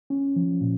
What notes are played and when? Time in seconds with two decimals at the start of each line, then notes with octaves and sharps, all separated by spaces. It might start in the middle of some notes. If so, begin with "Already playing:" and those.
0.10 C#4
0.36 F3
0.61 A#2